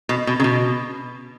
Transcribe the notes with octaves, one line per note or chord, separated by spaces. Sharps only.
B2
B2
C#3
B2